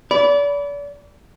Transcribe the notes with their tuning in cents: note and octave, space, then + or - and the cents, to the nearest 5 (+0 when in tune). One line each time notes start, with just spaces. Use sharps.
D5 -35 B5 +0